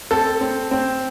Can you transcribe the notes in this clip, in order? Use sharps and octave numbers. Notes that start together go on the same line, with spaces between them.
C4 A4
C4
C4